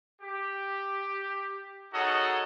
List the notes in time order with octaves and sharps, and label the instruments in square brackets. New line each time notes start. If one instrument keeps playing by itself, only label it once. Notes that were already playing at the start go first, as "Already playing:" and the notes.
[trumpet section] G4
D#4 F#4 G#4 A4 C#5 D#5